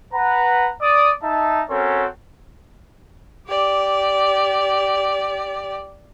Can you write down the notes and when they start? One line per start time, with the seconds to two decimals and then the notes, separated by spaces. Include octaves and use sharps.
0.14 B4 F#5 A#5
0.81 D5 D#6
1.22 D#4 E5 A5
1.70 C4 C#4 F#4 A4 A#4 C#5
3.48 G4 D5